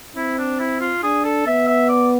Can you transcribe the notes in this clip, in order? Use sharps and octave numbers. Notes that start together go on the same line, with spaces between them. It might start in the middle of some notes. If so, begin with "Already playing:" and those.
C4 E4
D4
E4
F4
D4 G#4
A4
B3 E5
E5
D5